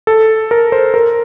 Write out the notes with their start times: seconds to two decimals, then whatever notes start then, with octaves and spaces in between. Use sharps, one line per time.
0.07 A4
0.51 A#4
0.72 C5
0.94 A#4